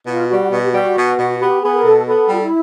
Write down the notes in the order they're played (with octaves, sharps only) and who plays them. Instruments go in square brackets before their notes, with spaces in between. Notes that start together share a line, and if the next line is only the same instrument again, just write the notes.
[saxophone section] B2 [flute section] F4
[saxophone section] G3 [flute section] F#4
[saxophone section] B2 [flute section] F#4
[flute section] G4
[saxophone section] G3 [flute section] F#4
[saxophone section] B2
B2
[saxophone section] B3 [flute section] G4
[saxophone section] B3 [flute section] G#4
[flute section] A#4
[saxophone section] B2 [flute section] A4
[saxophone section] B3 [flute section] A4
[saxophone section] G3 [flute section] F4
[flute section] E4